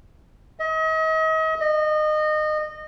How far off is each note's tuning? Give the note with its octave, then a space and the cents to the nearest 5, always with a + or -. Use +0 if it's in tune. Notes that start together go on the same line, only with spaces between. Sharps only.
D#5 +40
D#5 -25